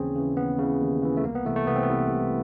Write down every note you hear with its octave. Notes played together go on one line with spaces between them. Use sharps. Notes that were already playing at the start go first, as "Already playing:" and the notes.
Already playing: D#2 C#3 E3 C4 C#4 G#4
C#3 E3
D#2 B3
C#3 E3
D#2
C#3 E3
A3
C2 A#3
B3
C3 E3 A3
A3
C2 B3
C4
B3
C3 E3
C2